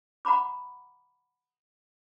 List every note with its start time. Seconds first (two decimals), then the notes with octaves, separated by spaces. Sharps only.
0.25 F#5 A#5 B5 D6